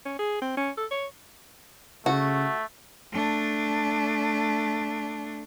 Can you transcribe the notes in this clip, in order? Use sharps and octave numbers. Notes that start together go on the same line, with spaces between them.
C#4
G#4
C4
C#4
A4
C#5
C#3 A3 F#4
A3 D4